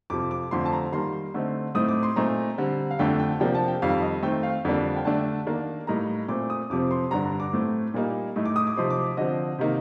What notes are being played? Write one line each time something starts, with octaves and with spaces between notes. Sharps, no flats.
F2 C3 F3 D6
D6
F2 D3 F3 A3 C6
A5
A#5
D#3 G3 A#3 C6
D3 A3 C4 D#4
A2 A3 C4 D#4 D#6
D6
C6
A#2 A3 C4 D#4 A#5
D3 G3 C4
F5
F2 D3 A3 D4 G5
G5
C3 F3 A#3 D4 G5
A5
G5
F2 D#3 G3 F5
D#5
D#3 A3 C4 G5
F5
F2 D3 G3 A#3 D4
G5
D3 A3 D4 A5
D#3 A#3 D4
A2 G3 A#3 D#4 A#5
A#2 A3 C4 D6
D#6
F2 C3 F3 C4 D6
C6
G2 D3 G3 D4 A#5
A#5
D6
A2 A3 C4
A#2 G3 A#3 D#4
A2 A3 D#4
D6
D#6
D6
C3 F3 C4 D#4 C6
D6
D3 F3 C4 D#5
C3 D#3 A#3 D#4